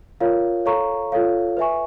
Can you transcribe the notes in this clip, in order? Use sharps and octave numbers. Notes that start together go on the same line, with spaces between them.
F4 A#4 C#5 F5
A4 C#5 F5 A#5 C#6
F4 A4 C#5 F5
B4 E5 G#5 C#6